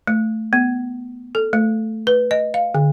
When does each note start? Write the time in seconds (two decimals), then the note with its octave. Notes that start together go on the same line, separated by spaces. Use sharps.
0.07 A3
0.53 B3
1.35 A4
1.53 A3
2.07 B4
2.31 D#5
2.54 F5
2.75 D3